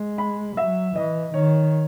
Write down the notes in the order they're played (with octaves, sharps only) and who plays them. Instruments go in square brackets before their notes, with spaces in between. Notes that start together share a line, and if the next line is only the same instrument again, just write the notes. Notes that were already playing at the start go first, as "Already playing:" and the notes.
Already playing: [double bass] G#3
[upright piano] B5
[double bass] F#3 [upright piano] E5
[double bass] E3 [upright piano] D#5
[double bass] D#3 [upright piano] C#5